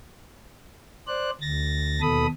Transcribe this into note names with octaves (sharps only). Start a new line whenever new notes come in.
C5 D5 F#6
D2 A6 A#6
D#2 B2 A4 B5 D#6